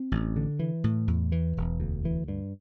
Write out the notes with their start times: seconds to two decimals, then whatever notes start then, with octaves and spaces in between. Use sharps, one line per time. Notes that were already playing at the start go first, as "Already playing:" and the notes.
Already playing: C4
0.12 A1
0.36 D3
0.59 E3
0.84 A2
1.08 E2
1.32 E3
1.57 E1
1.80 D2
2.05 E3
2.28 G2